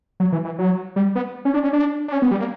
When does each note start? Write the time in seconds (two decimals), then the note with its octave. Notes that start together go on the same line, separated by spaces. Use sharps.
0.20 F#3
0.32 E3
0.45 E3
0.59 F#3
0.96 G3
1.15 B3
1.45 C#4
1.54 D4
1.64 C#4
1.73 D4
2.08 D4
2.12 C#4
2.22 B3
2.31 G3
2.40 A#3